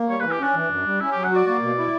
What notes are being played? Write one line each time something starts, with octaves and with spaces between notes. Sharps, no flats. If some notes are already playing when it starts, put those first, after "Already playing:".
Already playing: A#3
G3 C#5
E3 B4
G4
C#4 D4
E3
F#2
G3
C#4 E4
F#3 G4
F#5
F#4 D5
A#3 D5
B2
E4